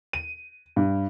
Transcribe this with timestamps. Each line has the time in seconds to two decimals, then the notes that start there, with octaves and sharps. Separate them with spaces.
0.13 D#7
0.76 G2